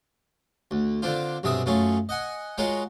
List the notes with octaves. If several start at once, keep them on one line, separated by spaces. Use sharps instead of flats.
D2
D3 C4 D4 F4
B1 G2 C3 G#4 E5 D#6
F#2 A3 F4 G#4 C#5
D#5 F#5 G#5
G#3 F4 F#4 G#4 A#4 C#5